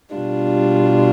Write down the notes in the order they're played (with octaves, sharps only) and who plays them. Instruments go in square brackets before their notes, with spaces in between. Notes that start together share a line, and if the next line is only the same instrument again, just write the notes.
[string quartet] B2 G3 D4 F4